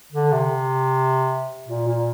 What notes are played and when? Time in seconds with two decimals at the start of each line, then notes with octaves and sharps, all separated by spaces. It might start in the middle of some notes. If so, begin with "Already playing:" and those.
0.12 D3
0.32 C3
1.68 A#2
1.88 A#2